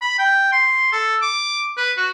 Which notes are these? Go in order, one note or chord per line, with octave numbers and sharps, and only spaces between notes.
B5
G5
C6
A4
D6
B4
F#4